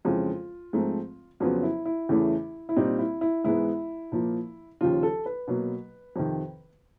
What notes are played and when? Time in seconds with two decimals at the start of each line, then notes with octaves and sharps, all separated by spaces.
0.05 F2 C#3 E3 G#3 F4
0.73 G#2 F3 A3 C4
1.40 F2 C#3 F#3 B3 F4
1.63 E4
1.85 E4
2.09 E2 C#3 E3 A3
2.69 E4
2.76 A#2 G3 C4 D#4
2.99 E4
3.21 E4
3.44 G#2 E3 G#3 B3 E4
4.12 A#2 F3 A#3
4.81 D#2 C#3 F3 F4
5.03 A4
5.26 B4
5.47 B2 F#3 A#3
6.16 F2 C3 D#3